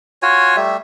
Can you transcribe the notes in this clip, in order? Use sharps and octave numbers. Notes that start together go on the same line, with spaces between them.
F4 F#4 C#5 G#5
G3 A3 E5